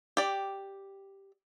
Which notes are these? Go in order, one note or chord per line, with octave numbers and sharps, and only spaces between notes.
G4 D5